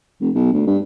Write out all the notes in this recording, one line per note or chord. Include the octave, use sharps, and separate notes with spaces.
F1
B1
D2
G2